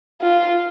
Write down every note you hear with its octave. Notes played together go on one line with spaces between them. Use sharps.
F4